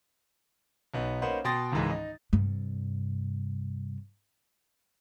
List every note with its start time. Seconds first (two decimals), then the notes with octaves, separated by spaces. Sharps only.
0.94 B1 B3 D#4
1.22 A#3 C#4 D#4 B4 C5 F#5
1.45 B2 G5 C6 D#6 A6 A#6
1.72 C#2 G#2 D#3 E3 G#3
1.90 D#4
2.33 G2 C3